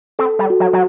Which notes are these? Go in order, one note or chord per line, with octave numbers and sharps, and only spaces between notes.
C4 A4
G3
F#4
F#3
F#3